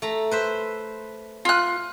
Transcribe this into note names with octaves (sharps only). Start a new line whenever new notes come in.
A3 A#5
B4 C5 E5
F4 F#6